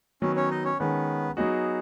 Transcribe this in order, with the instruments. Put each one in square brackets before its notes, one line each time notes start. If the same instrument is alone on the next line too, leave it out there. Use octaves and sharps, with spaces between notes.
[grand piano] D#3 F#3 B3 [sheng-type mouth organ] C#4
[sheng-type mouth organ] C#4 C#5
D#4 D#5
C#4 C#5
[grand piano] D#3 G#3 C#4 [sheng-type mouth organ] B3 B4
[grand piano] F#3 B3 D#4 F#4 [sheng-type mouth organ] G#4